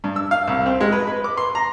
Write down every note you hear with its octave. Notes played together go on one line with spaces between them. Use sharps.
G2
E6
F5
C2
C4
G#3
B4
B5
D6
C6
A#5